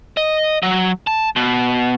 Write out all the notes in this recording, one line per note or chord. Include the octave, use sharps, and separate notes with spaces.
D#5
F#3
A5
B2